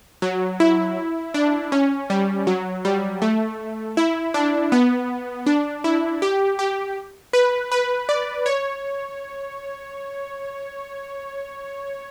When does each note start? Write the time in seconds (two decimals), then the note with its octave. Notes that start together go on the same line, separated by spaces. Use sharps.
0.22 F#3
0.60 E4
1.34 D4
1.72 C#4
2.10 G3
2.47 F#3
2.85 G3
3.22 A3
3.97 E4
4.34 D4
4.72 B3
5.46 D4
5.84 E4
6.22 G4
6.59 G4
7.33 B4
7.72 B4
8.09 D5
8.46 C#5